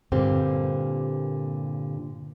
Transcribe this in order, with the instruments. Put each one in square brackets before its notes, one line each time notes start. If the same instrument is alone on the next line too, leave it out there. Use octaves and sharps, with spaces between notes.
[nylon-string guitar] G2 A#2 D3 G3 A#3 C4